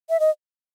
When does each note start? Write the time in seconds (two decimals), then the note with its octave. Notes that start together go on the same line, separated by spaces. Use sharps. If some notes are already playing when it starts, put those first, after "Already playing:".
0.10 E5
0.20 D#5